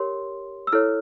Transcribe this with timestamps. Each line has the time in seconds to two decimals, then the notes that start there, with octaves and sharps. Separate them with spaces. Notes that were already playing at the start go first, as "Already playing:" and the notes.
Already playing: G4 A#4 C#5 C6
0.67 E6
0.72 E4 A4 C#5 F6